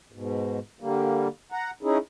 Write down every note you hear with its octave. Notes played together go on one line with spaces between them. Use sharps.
G#2 B2
D3 G3 A#3
F#5 A#5
C#4 D#4 E4 G#4